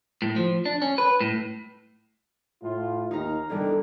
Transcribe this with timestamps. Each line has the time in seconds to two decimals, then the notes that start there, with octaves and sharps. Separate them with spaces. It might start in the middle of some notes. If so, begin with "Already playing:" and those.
0.22 A2
0.36 F3
0.66 D4
0.82 C#4
0.98 B4
1.20 A2
2.62 A2 F4
3.11 D#2 D#4 F5 A#5
3.50 F#1 E2 D#3 G3 A#3 D4 A4